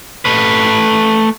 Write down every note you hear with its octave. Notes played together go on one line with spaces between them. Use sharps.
A3 B4